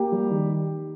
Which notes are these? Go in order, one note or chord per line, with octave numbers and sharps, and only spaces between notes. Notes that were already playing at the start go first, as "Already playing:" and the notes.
Already playing: A#3 G4
G3
D#3